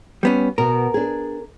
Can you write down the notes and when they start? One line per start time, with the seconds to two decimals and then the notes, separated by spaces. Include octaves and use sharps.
0.23 G3 B3 C#4
0.58 B2 B3 A#4
0.94 D4 G#4